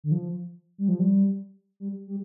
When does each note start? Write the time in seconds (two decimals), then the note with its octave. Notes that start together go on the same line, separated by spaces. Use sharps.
0.04 D3
0.12 F3
0.78 G3
0.89 F3
0.99 G3
1.80 G3
2.07 G3